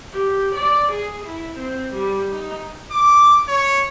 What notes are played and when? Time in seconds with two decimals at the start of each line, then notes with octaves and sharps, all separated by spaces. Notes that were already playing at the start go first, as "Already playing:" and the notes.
0.12 G4
0.55 D5
0.92 G#4
1.26 E4
1.58 C4
1.94 G3
2.33 D#4
2.92 D6
3.49 C#5